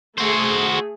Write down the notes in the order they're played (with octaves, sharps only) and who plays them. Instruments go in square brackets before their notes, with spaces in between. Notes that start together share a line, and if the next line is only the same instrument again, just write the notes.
[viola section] A3 G#4 [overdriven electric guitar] F#4 C5